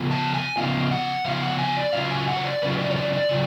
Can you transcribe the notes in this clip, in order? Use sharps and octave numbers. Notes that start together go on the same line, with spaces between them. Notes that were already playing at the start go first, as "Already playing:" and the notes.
Already playing: C#3 F3 B3 F4
A5
G#5
C#3 F3 B3 F4
F#5
C#3 F3 B3 F4 F5
F#5
G#5
D5
C#3 F#3 C#4 F4 F5
G#5
F#5
C#5
D5
C#3 F#3 C#4 F4 B4
D5
C#5
D5
D5
C#3 F#3 F4